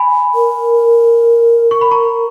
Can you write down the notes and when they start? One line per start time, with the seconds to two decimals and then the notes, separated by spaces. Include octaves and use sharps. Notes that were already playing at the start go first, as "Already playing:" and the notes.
Already playing: G#5 B5
0.35 A#4
1.71 C#6
1.81 B5
1.91 A#5 C#6